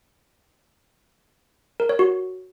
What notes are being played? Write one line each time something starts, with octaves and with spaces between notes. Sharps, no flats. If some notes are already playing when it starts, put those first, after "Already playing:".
A#4
C#5
F#4